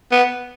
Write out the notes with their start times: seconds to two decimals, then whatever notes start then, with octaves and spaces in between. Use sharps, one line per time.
0.12 B3